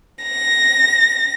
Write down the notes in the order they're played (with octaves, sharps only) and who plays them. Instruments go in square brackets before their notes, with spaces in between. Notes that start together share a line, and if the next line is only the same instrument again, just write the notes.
[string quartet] A#6